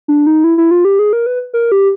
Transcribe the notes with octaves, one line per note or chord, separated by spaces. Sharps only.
D4
D#4
E4
E4
F4
G4
G#4
A#4
B4
A#4
G4